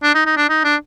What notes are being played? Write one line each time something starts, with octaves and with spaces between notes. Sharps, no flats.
D4
D#4
D#4
D4
D#4
D4